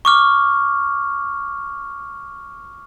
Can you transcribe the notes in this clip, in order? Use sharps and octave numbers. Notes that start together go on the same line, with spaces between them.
C#6 D6 F6